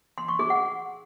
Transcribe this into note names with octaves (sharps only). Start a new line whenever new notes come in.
C6
C#6
G#4
F#5